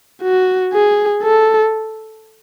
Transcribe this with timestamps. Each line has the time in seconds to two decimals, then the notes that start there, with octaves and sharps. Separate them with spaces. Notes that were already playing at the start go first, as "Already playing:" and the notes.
0.22 F#4
0.73 G#4
1.23 A4